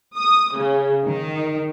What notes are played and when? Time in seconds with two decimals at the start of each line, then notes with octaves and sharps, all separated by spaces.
0.17 D#6
0.57 C#3
1.07 D#3